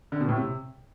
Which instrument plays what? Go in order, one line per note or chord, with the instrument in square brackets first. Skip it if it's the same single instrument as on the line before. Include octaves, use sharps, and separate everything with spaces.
[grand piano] D3
B2
A2
C3